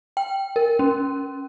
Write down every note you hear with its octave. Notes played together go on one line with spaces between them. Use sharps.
G5
A#4
C#4